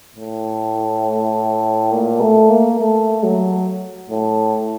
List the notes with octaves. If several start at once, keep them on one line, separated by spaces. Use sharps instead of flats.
A2
A#2
A3
A#3
A3
F#3
A2